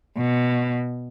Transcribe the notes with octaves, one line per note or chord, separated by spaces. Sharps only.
B2